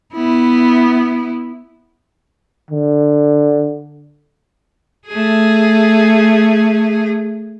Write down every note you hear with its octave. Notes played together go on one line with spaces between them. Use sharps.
B3 E4
D3
A3 G#4